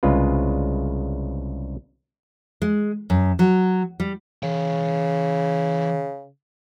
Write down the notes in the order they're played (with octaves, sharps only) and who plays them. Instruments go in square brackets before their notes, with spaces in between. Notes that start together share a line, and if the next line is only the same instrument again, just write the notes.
[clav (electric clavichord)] C2 C#3 G#3 F4 B4
[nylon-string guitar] G#3
F#2
F#3
G3
[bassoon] C#3 [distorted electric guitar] E3 G5